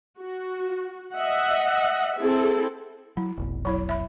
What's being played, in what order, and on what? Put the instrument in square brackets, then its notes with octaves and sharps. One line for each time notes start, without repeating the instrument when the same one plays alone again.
[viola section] F#4
D#5 E5 F#5
C4 E4 G#4 A4
[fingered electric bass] F#3 [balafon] E4
[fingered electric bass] F1 B1
[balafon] F#3 E4 C#5
E5 B5